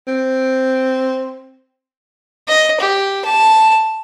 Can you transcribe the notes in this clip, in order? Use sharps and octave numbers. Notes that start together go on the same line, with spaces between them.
C4
D#5
G4
A5